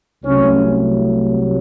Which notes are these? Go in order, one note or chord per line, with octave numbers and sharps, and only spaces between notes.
C2 C3 F#3 A3 C#4